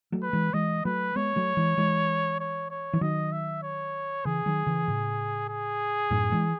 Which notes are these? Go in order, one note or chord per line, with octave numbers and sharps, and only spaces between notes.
F#3 A3
B4
E3 G#3
E3 G#3 D#5
F#3 A3 B4
G#3 B3 C#5
F#3 A3
E3 G#3
E3 G#3
C#5
C#5
E3
D#3 F#3 D#5
E5
C#5
C#3 E3 G#4
D#3 F#3
C#3 E3
A2 C#3
G#4
F#2 A2
E3 G#3